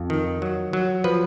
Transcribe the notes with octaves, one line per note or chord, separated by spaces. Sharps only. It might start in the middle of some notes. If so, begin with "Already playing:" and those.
Already playing: F2
D#3
F#3
F#3
F3 B4